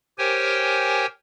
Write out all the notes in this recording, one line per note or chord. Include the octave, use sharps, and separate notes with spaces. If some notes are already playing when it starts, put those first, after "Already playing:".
G4 A#4 C5 C#5 G5 G#5